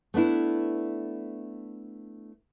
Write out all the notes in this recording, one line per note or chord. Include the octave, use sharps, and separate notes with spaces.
A3 B3 D4 E4